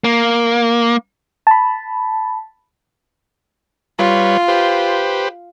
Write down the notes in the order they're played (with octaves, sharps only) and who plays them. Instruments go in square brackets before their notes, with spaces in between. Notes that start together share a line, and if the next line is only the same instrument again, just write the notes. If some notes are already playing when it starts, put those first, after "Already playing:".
[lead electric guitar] A#3
[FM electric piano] A5 B5
[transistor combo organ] G3 B4 C#5 [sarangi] F4
[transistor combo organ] G4 B4 C5